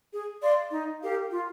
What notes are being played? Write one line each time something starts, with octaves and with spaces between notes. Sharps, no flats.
G#4
D5 F5 C6
D#4
G4 A#4 F5
F4